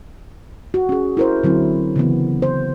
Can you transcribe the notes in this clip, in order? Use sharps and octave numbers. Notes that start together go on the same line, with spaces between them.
F#4
C#4 G#4
E4 A#4 C5
D3 F#3 C4 E4
C#3 E3 B3
C5